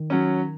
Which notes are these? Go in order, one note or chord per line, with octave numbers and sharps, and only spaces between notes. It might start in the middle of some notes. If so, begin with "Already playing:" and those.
Already playing: D#3
F#3 C#4